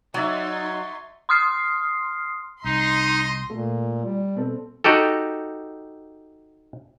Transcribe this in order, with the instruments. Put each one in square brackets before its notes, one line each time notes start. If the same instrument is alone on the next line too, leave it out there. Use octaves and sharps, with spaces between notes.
[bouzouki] F#3 [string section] D#4 C6 [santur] C#5 D5 E5
[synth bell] C6 D#6 F6 C7
[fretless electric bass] C2 [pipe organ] D#4 [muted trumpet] D#5 [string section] C6
[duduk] A#2 [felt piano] A3
[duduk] G3
[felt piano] B2 C4 A4
[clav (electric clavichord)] D#4 F#4 G4 A4